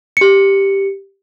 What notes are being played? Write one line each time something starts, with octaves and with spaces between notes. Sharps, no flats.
G4 C#7